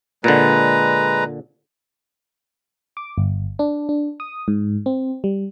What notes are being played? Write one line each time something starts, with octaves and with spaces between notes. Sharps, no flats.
A#2 D3 G#3 B4 A#5
D6
G1
D4
D4
D#6
G#2
C4
G3